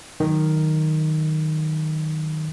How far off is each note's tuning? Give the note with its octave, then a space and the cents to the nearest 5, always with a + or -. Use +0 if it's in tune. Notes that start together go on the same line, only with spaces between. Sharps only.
D#3 +0 F#3 +0